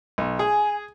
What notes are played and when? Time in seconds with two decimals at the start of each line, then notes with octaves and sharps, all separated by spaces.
0.18 B1
0.39 G#4 G#5